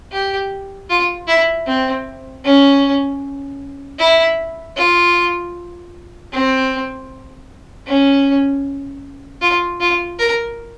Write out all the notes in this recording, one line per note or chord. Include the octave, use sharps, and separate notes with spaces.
G4
F4
E4
C4
C#4
E4
F4
C4
C#4
F4
F4
A#4